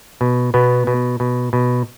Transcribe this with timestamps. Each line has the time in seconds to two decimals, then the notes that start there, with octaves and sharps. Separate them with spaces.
0.21 B2
0.54 B2 B3
0.87 B2
1.20 B2
1.53 B2